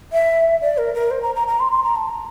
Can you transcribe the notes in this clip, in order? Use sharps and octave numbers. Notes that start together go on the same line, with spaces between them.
E5
D5
A#4
A#4
C5
A#5
A#5
A#5
C6
C6
A#5
A5
A#5